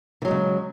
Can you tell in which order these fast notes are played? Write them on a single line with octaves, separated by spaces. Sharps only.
E3 F#3 G#3 C#3